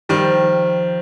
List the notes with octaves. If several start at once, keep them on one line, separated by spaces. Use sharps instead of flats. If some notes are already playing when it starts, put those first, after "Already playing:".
D#3 F3 G3